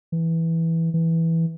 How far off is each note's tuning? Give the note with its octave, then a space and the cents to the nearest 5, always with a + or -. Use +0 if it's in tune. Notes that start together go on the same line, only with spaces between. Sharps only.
E3 -5
E3 -5